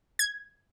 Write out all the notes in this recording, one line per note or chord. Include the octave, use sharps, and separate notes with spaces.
G#6